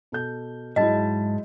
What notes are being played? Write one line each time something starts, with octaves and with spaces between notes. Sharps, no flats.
B2 A4 G6
G#2 F#3 G#3 E4 D#5 A5